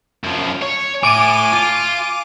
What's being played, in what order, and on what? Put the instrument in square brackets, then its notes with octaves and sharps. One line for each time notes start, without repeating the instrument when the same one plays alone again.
[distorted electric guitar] F#2 F3
C#5
[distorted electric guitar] A2 [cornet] G#5 [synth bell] D6 D7 D#7
[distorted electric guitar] F4